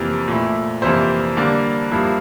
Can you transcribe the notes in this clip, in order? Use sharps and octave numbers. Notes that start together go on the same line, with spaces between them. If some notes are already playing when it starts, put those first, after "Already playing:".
Already playing: F2 C3 E3 A#3
A#2 A3 E4
F2 C3 E3 A#3 E4 C5
D3 G3 A#3 D5
G2 F3 A#3 E4